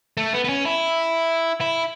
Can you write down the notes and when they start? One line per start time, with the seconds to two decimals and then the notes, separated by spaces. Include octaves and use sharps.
0.17 A3
0.33 B3
0.44 B3
0.49 C#4
0.65 E4
1.61 E4